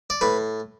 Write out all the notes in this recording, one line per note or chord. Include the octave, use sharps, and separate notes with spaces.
D5
A2 B4